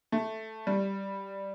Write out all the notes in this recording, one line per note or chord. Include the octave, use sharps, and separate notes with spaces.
A3
G3